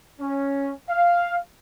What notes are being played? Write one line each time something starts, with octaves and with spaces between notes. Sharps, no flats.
C#4
F5